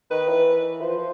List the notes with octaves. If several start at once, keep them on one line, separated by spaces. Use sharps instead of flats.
D#3 B4
E3
F3 C5
F3